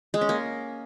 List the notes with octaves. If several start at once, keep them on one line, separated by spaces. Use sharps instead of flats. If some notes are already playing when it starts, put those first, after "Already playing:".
G#3
C#4
A#3